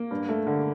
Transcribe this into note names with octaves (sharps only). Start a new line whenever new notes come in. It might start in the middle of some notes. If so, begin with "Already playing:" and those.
Already playing: A#3
G2
A3
D3